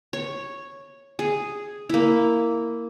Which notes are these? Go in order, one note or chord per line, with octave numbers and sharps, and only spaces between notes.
C#5
G#4
A#3 E4